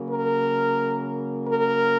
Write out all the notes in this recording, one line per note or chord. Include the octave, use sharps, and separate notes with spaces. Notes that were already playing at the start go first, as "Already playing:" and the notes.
Already playing: C#3 F#3 A#3
A#4
A#4